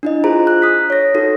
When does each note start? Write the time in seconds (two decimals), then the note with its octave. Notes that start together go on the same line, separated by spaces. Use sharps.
0.03 D4 E4 D#5
0.24 F4 G#4 C5 A#5
0.47 F#6
0.62 D#6 B6
0.90 C#5 A#6
1.14 D#4 F#4 A4